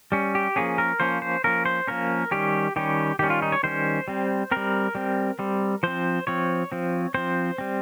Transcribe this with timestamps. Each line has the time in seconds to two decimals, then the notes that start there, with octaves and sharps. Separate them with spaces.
0.12 G3 C#4
0.35 G4
0.56 F3 A#3 C#4 G#4
0.78 A#4
1.00 F3 A#3 C#4 C5
1.22 C5
1.44 F3 A#3 C#4 A#4
1.66 C5
1.87 F3 A#3 C#4 A#4
2.31 D#3 G3 C#4 G4
2.76 D#3 G3 C#4 G4
3.19 D#3 G3 C#4 G4
3.30 F4
3.42 D#4
3.52 C#5
3.63 D#3 G3 C#4 C5
4.08 G3 C4
4.51 G3 C4 A#4
4.95 G3 C4
5.39 G3 C4
5.83 F3 C4 C5
6.27 F3 C4 C#5
6.72 F3 C4
7.14 F3 C4 C5
7.58 G3 C4